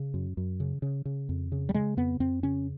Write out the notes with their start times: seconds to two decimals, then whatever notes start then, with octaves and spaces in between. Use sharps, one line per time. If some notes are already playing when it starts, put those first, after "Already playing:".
Already playing: C#3
0.14 F#2
0.37 F#2
0.60 C#3
0.82 C#3
1.05 C#3
1.29 F2
1.52 C#3
1.69 G3
1.74 C#3 G#3
1.97 F2 B3
2.20 F2 C4
2.43 C#3 C#4